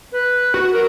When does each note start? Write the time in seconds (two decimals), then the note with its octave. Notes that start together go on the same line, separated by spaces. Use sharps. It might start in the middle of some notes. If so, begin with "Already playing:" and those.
0.12 B4
0.54 F#4
0.72 A#4